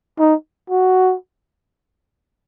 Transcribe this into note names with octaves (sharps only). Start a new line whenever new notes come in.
D#4
F#4